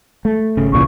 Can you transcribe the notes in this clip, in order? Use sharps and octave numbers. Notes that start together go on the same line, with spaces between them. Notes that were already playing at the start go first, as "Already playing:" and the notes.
A3
G#1 C#3
C2 A#2 E3 C#6